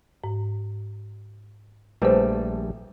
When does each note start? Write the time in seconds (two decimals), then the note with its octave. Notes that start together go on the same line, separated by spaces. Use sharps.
0.24 G#2
2.02 A#1 G3 A3 B4 C5